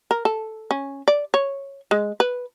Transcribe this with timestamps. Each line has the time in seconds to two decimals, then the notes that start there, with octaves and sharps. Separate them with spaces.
0.11 A#4
0.25 A4
0.71 C#4
1.08 D5
1.34 C#5
1.91 G#3
2.20 B4